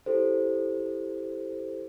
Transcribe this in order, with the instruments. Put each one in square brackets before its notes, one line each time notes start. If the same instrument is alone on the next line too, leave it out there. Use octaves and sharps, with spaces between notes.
[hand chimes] E4 G4 A4 C5